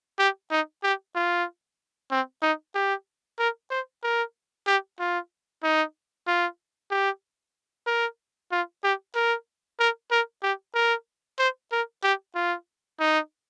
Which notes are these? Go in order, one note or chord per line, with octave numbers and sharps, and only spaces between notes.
G4
D#4
G4
F4
C4
D#4
G4
A#4
C5
A#4
G4
F4
D#4
F4
G4
A#4
F4
G4
A#4
A#4
A#4
G4
A#4
C5
A#4
G4
F4
D#4